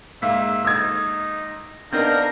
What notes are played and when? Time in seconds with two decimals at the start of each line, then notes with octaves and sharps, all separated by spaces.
0.22 G#2 A#3 E5 F5 B6
0.65 D#4 E6 G#6
1.93 B3 C4 D4 D#4 A#4 F5 G6 A#6